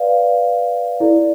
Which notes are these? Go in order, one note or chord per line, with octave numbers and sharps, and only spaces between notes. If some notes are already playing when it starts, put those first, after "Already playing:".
Already playing: B4 D5 F5
E4 A4 D5